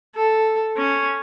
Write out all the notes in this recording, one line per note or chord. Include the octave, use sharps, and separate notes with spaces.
A4
C#4